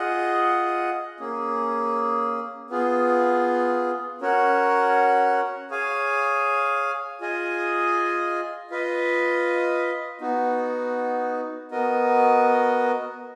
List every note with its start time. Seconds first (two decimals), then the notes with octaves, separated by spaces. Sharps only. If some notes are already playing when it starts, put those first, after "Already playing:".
Already playing: F4 G#4 D#5 F#5
1.20 A#3 C#4 G#4
2.70 B3 F4 G#4
4.21 C#4 F#4 A#4 C#5 F#5
5.71 G#4 C#5 F5 G#5
7.21 F4 G#4 D#5 G#5
8.70 F4 B4 D#5
10.21 B3 D#4 F#4
11.71 B3 F#4 A#4 D#5